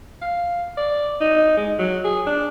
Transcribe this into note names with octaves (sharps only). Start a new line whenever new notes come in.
F5
D5
D#4
G#3
F#3
G#4
D4